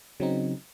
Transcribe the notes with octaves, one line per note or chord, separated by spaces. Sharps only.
C#3 F#3 C4 D#4